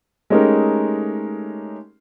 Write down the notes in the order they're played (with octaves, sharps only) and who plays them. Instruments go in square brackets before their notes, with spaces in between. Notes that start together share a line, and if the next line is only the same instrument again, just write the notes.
[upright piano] G#3 A3 C#4 D#4 G4 A#4